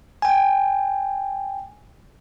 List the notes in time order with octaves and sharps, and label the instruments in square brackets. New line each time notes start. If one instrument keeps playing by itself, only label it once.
[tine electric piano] G5 G#5